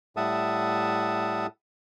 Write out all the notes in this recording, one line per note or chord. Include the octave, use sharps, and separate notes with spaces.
A2 G3 E5 F#5 A5 D#6